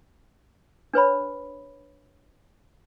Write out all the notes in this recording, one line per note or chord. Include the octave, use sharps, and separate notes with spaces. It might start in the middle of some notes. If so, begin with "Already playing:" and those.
D4 B4 C#5 B5